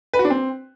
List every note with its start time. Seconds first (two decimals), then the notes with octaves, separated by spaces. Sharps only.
0.13 B4
0.19 F#4
0.25 D4
0.30 C4